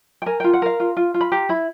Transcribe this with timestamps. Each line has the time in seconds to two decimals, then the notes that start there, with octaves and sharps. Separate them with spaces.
0.22 G5
0.26 A#4 G#5
0.40 F4 G5
0.53 F#5
0.62 A#4 F5
0.80 F4
0.97 F4
1.14 F4
1.21 B5
1.32 G4 A#5
1.49 E4 B5